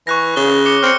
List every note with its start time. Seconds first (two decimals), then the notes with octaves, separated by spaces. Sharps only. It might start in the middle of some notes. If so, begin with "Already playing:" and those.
0.07 E3 C#6 F#6 A#6
0.36 C#3 G7
0.66 D6 C#7 G7
0.83 C4 F6 C#7